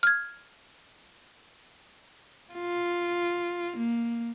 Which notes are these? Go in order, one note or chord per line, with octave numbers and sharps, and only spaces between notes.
F6 G#6
F4
A#3